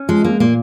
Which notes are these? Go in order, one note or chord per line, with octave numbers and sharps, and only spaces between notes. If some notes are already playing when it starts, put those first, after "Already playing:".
Already playing: C#4
F3 G#3
G#3 A#3
A#2 A#3